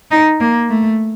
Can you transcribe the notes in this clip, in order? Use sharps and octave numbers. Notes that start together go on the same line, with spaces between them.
D#4
A#3
A3